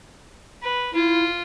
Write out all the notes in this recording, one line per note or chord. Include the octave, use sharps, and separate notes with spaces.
B4
E4 F4